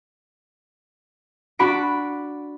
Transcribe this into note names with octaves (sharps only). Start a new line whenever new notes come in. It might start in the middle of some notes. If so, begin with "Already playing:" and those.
D4 F#4 B5 D7